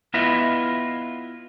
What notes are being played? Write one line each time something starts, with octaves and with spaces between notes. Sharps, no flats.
B3 E4 F4 B4 D#5 E5